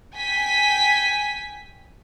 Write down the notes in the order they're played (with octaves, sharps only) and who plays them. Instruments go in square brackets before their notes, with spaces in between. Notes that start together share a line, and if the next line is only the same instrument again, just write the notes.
[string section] G5 G#5 B6